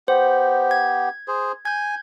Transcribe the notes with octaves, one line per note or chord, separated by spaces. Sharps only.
B3 G4 C5
G#6
G#4 C5
G#5 G6 G#6